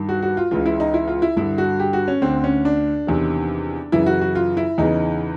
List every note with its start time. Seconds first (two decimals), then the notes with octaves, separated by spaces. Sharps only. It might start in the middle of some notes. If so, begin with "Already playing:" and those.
Already playing: G2 D#3
0.09 F#4
0.22 F#4
0.37 F4
0.51 C#2 C#3 E3 F4
0.66 E4
0.80 D#4
0.94 E4
1.08 F4
1.22 E4
1.37 G2 D3 E4
1.58 F#4
1.80 G4
1.93 F#4
2.08 C#4
2.21 D2 D3 C4
2.44 C#4
2.65 D4
3.07 E2 C3 D#3
3.92 F#2 C#3 E3 E4
4.06 F#4
4.21 F#4
4.35 F4
4.57 E4
4.78 E2 C#3 E3 D#4